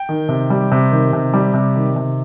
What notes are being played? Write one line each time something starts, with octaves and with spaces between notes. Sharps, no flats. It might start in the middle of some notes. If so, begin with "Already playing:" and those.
Already playing: G5
D#3
C3
G3
C3
D#3
C3
G3
C3
D#3
C3